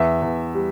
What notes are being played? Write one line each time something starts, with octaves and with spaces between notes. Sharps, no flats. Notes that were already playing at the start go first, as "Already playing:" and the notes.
Already playing: E2 E5
E2
G3